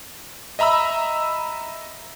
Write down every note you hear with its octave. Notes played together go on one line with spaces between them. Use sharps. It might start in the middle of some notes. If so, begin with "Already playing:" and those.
D#5 E5 A#5 B5 E6